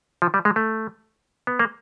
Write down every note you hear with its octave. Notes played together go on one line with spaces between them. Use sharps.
F3
G3
G#3
A3
B3
A#3